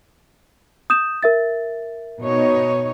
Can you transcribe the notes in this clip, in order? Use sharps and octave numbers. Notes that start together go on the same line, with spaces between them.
D#6 G6 E7
A#4 E5 A6
B2 D#4 C#5